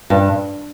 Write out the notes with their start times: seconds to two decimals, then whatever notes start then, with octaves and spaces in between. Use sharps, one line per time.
0.10 G2